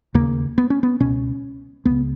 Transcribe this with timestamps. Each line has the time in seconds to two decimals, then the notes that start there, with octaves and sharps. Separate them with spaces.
0.14 D#2 C#3 A#3
0.58 B3
0.70 C#4
0.83 B3
1.00 C#2 B2 C#4
1.85 C#2 C#3 B3